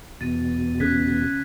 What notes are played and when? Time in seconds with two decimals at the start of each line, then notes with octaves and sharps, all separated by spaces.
0.21 E2 B2 A6 D#7
0.80 C#3 F#6 G#6 B6